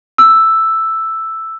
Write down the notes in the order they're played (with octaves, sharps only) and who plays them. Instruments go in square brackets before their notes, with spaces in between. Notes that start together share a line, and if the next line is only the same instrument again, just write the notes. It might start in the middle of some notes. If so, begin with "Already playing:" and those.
[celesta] E6